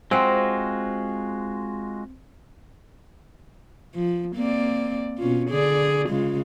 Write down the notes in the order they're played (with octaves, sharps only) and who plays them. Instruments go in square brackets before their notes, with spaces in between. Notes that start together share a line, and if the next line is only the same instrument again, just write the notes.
[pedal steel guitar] G#3 F4 F#4 [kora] C4 [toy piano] C5 F5 G#5
[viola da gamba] F3
A#3 C4 D5
B2 C#4 F4
D3 G#4 D5
C#3 G#3 F4